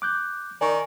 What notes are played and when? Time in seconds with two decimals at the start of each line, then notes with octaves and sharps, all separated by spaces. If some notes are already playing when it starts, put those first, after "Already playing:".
0.02 D6 F#6 G6
0.61 D#3 D5 G#5 C#6